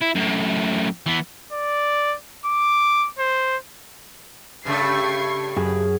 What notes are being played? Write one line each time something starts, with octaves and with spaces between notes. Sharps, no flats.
E4
F#2 A2
E3 B3
D5
D6
C5
G2 C#3 A3 C#6 G#6 C7
F#2 G#4